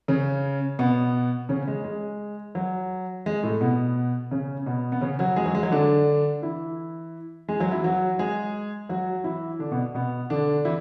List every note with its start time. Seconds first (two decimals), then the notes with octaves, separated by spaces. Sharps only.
0.08 C#3 C#4
0.79 B2 B3
1.49 C#3 C#4
1.68 G#3
1.84 G#3
2.55 F#3
3.26 G#3
3.43 A2 A3
3.61 B2 B3
4.31 C#3 C#4
4.66 B2 B3
4.92 B3
5.01 C#3 C#4
5.19 F#3 F#4
5.36 G#3 G#4
5.46 F#3 F#4
5.55 G#3
5.63 F#3
5.72 D3 D4
6.42 E3 E4
7.49 G#3 G#4
7.59 F#3 F#4
7.71 E3 E4
7.84 F#3 F#4
8.19 G#3 G#4
8.89 F#3 F#4
9.24 E3 E4
9.59 D3 D4
9.71 B2 B3
9.94 B2 B3
10.30 D3 D4
10.65 E3 E4